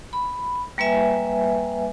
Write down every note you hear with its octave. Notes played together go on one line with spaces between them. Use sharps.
B5
G3 A#3 B4 E5 G#5